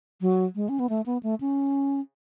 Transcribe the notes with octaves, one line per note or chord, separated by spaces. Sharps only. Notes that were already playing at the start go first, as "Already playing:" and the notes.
F#3
G#3
C#4
B3
A3
B3
A3
C#4